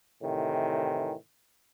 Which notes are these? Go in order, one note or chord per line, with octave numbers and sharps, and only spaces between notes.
A2 C3 D#3 E3